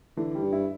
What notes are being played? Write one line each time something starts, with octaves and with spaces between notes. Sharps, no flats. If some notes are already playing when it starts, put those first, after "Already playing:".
D3 E3
G3
G2
E4